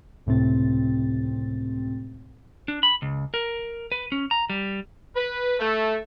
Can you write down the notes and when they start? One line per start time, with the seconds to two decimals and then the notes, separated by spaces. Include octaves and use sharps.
0.26 C#2 A2 C3 C4 A6
2.68 D4
2.83 B5
3.02 C#2
3.34 A#4
3.92 B4
4.12 C#4
4.31 A#5
4.50 G3
5.16 B4
5.59 A3